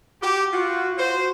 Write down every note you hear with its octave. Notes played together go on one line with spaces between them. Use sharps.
F#4 G4
F4 F#4
F#4 C5